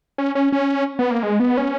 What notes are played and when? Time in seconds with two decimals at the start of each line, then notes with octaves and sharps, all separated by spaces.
0.18 C#4
0.35 C#4
0.52 C#4
0.99 B3
1.11 A#3
1.23 G#3
1.40 B3
1.57 C#4